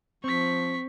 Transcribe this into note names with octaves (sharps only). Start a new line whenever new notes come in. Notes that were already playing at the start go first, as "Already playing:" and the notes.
F3 C4 C#6 B6